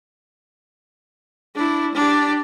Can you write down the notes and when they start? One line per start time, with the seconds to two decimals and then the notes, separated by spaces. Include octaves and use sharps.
1.55 D4 E4
1.94 D4 G4